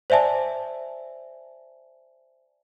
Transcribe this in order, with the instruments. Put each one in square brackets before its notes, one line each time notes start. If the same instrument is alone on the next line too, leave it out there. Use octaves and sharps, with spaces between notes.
[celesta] C5 D5 E5 G#5 A5